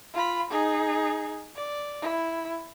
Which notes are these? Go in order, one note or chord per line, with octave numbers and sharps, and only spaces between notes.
F4 B5
D#4 G#4
D5
E4